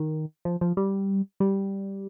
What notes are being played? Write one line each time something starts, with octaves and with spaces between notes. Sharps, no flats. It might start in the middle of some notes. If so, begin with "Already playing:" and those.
Already playing: D#3
F3
F3
G3
G3